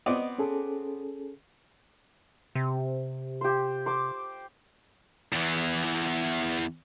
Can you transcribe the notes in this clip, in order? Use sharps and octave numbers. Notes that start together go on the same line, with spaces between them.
B3 C4 D5 D#5
C#4 G#4 A4
C3
G4 C5
C5 D6
E2 E3